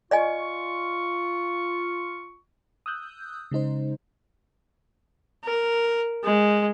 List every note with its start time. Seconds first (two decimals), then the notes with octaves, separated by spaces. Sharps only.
0.11 F4 D5 D#5 G#5 C#6
2.86 D#6 E6 F#6 G6
3.51 C#3 G#3 D#4 C5
5.44 A#4
6.24 G#3